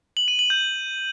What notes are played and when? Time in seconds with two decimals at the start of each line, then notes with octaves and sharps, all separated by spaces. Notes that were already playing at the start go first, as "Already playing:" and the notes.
0.17 F#7
0.28 D#7
0.39 F#7
0.50 G6